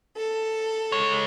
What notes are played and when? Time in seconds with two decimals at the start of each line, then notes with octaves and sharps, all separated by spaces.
0.17 A4
0.92 G#3 C#5